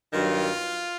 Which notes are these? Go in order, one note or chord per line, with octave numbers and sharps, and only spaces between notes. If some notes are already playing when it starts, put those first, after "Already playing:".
G2 D#3 F#3 F4